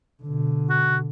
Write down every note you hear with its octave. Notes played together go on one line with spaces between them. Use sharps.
B2 D3
F#4